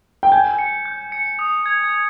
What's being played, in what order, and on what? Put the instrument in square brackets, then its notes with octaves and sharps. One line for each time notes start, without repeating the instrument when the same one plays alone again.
[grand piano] G5
[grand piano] G#5 [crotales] G6
[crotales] C#7
G6
C#7
D#6
G#6
G#6